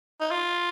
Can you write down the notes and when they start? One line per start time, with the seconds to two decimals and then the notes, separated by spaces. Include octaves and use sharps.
0.21 D#4
0.31 F4